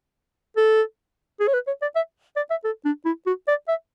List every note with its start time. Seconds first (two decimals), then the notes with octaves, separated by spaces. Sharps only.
0.57 A4
1.40 G#4
1.48 C#5
1.54 B4
1.67 C#5
1.82 D5
1.96 E5
2.36 D5
2.51 E5
2.64 A4
2.85 D4
3.05 E4
3.26 F#4
3.48 D5
3.68 E5